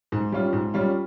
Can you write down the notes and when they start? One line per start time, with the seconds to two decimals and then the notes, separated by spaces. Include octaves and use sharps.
0.12 G#2
0.32 G3 C#4 F4
0.53 G#2
0.74 G3 C#4 F4